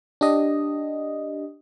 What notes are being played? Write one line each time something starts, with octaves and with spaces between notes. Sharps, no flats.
D4 G4 D#5